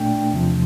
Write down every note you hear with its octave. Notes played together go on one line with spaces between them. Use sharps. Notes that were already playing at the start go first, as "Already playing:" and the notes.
Already playing: A#2 A3 D4 G5
E2 C3 F3